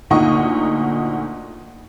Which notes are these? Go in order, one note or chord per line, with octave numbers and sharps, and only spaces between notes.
D2 A#2 D#4 F#5 C#6 D#6